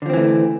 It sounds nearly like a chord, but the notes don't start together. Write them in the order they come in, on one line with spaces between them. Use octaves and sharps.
D3 F3 C4 E3 A3